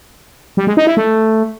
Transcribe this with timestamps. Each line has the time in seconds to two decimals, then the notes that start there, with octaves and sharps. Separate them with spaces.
0.57 G3
0.67 G#3
0.77 D#4
0.87 E4
0.97 A3